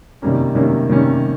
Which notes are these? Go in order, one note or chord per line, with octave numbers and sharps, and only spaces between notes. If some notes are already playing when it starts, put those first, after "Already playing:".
C3 D#3 G3 A#3 C#4
C3 D#3 G3 A#3 C#4
C3 D#3 G3 A#3 C#4